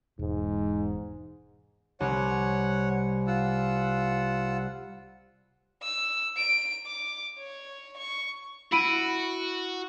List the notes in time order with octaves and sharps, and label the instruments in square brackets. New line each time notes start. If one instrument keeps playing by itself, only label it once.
[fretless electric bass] E1 [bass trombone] G#2
[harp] C2 [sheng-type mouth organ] C#5 F#5
[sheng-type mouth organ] F4 F#5 E6
[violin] E6
D7
D6
C#5
C#6
[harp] E4 [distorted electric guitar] F#4 [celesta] B5 D7 D#7